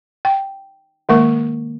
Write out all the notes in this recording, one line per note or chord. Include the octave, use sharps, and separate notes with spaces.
G5
D#3 G#3 A#3 A#4 C#6